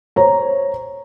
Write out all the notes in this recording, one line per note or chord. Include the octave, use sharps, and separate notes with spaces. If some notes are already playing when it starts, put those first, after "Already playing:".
C5 C#5 A#5